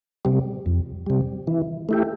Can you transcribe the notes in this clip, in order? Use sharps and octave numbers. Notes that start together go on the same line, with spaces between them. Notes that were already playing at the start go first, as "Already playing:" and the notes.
C3 G3
F2
C3 G3
E3
A3 E4 G4